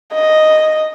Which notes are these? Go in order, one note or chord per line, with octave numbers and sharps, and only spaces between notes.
D#5